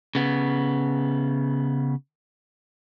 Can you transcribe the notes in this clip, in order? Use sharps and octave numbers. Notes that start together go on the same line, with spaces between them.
C#3 B3